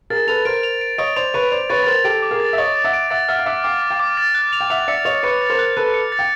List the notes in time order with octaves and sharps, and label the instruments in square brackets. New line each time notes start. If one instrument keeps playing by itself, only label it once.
[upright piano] G#4 A#4 [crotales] A6
[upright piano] A4 B4 [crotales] F7
[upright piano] A#4 C5 [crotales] D7
[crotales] F7
D7
[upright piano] C#5 D#5 [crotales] D7
[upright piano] C5 D5 [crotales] F7
[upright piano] B4 C#5 [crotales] F7
[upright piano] C5 D5 [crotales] F7
[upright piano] B4 C#5 [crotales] A6
[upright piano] B4
[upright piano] A#4 C5 [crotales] A6
[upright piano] G4 A4 [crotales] D7
[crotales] D6
[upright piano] G#4 A#4
[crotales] A6
[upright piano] E5
[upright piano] C#5 D#5 [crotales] A6
[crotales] A6
[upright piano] E5 F#5
[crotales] D7
[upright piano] E5 F#5 [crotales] A6
[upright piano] E5 F#5 [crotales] F6
[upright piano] F5
[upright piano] E5 F#5 [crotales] D6
[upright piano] F5 G5 [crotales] D6
[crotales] D6
[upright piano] F5 G5
[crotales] D6
A6
F#6
F7
[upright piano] G5
[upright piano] E5 F#5 [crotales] F7
[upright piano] D5 E5 [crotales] C#7
[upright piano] C#5 D#5 [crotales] F7
[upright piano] B4 C#5 [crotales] C#7
[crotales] A6
[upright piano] A#4 C5
[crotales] F#6
[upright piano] A4 B4 [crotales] F#6
[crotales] C#7
A6
[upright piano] G5